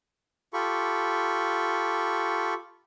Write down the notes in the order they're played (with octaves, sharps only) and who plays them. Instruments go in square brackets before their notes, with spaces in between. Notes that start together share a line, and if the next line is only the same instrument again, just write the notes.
[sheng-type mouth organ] F4 G4 A4 B5 C#6